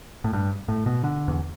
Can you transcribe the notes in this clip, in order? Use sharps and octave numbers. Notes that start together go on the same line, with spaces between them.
A2
G2
A2
B2
D3
E2